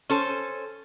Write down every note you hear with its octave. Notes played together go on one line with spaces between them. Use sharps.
C#4 A4 C5